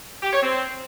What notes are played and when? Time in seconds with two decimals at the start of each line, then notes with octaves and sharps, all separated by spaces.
0.23 G4
0.33 C#5
0.42 C4